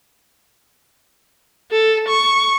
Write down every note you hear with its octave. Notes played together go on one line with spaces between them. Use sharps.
A4
C#6